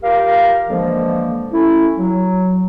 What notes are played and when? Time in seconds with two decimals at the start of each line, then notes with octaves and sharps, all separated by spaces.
0.03 F4 G4 A#4 F5
0.69 D3 E3 F3 G#3 A#3
1.52 A3 C#4 E4
1.98 F#3